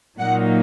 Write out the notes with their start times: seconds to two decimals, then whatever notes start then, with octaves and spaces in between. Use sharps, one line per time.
0.19 A#2 F#3 A#3 D#4 F#5